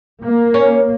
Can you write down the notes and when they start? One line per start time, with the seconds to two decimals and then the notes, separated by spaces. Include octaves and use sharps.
0.23 A#3
0.54 C#4